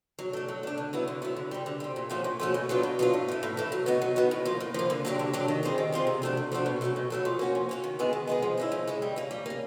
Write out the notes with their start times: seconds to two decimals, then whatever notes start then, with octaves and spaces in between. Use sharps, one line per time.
0.19 F#3
0.33 A3 D4
0.48 F#3
0.63 A3 D4
0.78 D3
0.93 F#3 B3 E4
1.08 D3
1.22 F#3 B3 E4
1.37 D3
1.51 G3 C4
1.66 D3
1.80 G3 C4
1.96 A#2
2.10 F3 A3 C#4 F#4
2.24 A#2
2.40 F3 A3 C#4 F#4
2.54 B2
2.69 F#3 B3 D4 F4
2.83 B2
2.99 F#3 B3 D4 F4
3.13 A2
3.28 E3 A3
3.43 A2
3.57 E3 A3
3.72 F#3
3.86 B3 D#4 F#4
4.02 F#3
4.16 B3 D#4 F#4
4.31 A2
4.45 F3 A#3
4.60 A2
4.74 F3 A#3
4.90 D3
5.05 F#3 A#3 D4 G4
5.19 D3
5.33 F#3 A#3 D4 G4
5.48 D#3
5.63 G3 C4 F4 G#4
5.78 D#3
5.92 G3 C4 F4 G#4
6.07 C3
6.22 F3 A3 D4 F#4
6.37 C3
6.52 F3 A3 D4 F#4
6.66 B2
6.81 F#3 A3 C#4 F#4
6.96 B2
7.10 F#3 A3 C#4 F#4
7.25 F3
7.39 A#3 C#4 F#4
7.55 F3
7.69 A#3 C#4 F#4
7.84 D#3
7.99 G#3 B3 E4 G#4
8.13 D#3
8.27 G#3 B3 E4 G#4
8.42 F3
8.58 G#3 C#4 E4
8.72 F3
8.87 G#3 C#4 E4
9.02 G3
9.16 A#3 C#4
9.31 G3
9.46 A#3 C#4